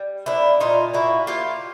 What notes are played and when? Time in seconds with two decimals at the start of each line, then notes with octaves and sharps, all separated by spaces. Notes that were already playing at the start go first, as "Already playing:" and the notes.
Already playing: G3
0.26 A#3 D4 E4
0.60 A#2 D#4 F4
0.94 A#3 E4 F#4
1.27 A#3 F4 G4